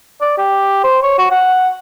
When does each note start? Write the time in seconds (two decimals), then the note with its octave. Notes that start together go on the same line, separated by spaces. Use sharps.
0.22 D5
0.38 G4
0.84 C5
1.03 C#5
1.19 F#4
1.31 F#5